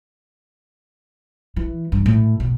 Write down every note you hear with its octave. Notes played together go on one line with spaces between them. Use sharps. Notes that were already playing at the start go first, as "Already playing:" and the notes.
E3
G2
A2
B2